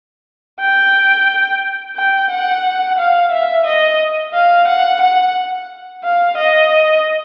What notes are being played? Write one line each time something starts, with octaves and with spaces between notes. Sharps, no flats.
G5
G5
F#5
F5
E5
D#5
F5
F#5
F#5
F5
D#5